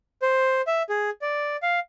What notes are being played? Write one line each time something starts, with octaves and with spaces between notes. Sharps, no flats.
C5
E5
G#4
D5
F5